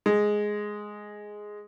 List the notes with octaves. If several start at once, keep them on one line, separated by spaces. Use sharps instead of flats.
G#3